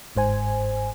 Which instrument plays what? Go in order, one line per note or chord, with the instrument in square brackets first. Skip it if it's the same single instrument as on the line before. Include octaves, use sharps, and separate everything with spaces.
[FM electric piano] G1 G#2 C5 G#5